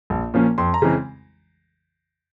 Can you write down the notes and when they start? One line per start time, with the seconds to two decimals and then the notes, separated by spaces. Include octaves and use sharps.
0.10 A#1
0.34 A#2 F3 A#3 C#4
0.58 F2 C6
0.74 A#5
0.82 C#3 E3 G#3 C4